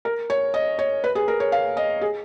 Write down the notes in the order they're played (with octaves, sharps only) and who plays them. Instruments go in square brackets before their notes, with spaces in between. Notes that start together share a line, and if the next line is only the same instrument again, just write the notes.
[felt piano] A#4
C#5
D#5
C#5
B4
G#4
A#4
C#5
F5
D#5
G#4